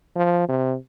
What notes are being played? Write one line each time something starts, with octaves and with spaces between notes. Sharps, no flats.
F3
C3